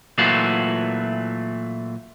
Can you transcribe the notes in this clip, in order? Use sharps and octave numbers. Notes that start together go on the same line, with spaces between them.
A#2 E3 F#3 A3 F4 F#4